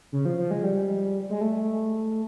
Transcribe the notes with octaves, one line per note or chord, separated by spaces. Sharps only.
C#3
F3
F3
G#3
G3
G#3
A3